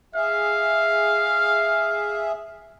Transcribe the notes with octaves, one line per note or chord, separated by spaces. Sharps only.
G#4 E5 F5